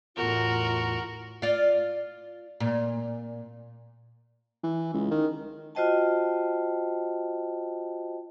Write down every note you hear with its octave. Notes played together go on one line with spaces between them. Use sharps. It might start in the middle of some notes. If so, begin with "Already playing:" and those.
E2 A2 F4 F#4 A#4
F4 D5
A#2
E3
C#2
D#3
F4 F#4 C5 D#5 G5 A5